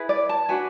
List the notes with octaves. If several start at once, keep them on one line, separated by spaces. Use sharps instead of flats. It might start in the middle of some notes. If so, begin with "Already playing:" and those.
Already playing: E4 G#4 B4
D5
A5
D4 F#4 B4 G#5